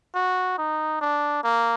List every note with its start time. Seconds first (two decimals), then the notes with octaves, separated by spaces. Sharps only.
0.15 F#4
0.58 D#4
1.01 D4
1.44 A#3